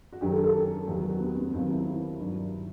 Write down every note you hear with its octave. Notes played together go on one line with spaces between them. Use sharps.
F#4
F#2 D#3 F#3 G4
A4
A4
E2 D#3 F#3 G4
G4
F#4
B3
C4
B3
D#2 D#3 F#3 C4
E4
E4
G2 D#3 F#3